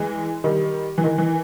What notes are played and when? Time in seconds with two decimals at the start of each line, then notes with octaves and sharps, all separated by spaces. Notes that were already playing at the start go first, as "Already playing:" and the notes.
Already playing: E3 G#3
0.44 D#3 G3
0.98 E3
1.04 D#3
1.18 E3